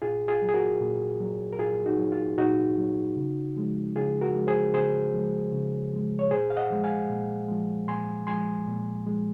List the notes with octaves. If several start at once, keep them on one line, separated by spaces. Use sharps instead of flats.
A#2 F4 G#4
F4 G#4
F#3
G#4
F#4 A#4
A#2
F#3
A#4
A#2 F4 G#4
D#4 F#4
F#3
F4
A#2 D#4 F#4
F#3
C#3
F3 G#3
C#3 F4 G#4
F#4 A#4
F3 G#3
G#4 C5
C#3 G#4 C5
F3 G#3
C#3
F3 G#3
C#5
A#2 G#4 C5
F5
D#5 F#5
F3 G#3
F5 G#5
A#2
F3 G#3
A#2 G#5 C6
F3 G#3 G#5 C6
A#2
F3 G#3